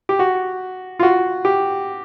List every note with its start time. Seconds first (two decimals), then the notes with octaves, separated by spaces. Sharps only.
0.09 G4
0.19 F#4
0.99 F4
1.03 F#4
1.45 G4